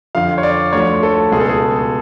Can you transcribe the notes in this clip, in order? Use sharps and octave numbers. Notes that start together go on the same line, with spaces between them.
F2 D3 F3 F5
C#5
D5
D2 D3 F3 C#5
A4
C#2 B2 G#4
A4
G#4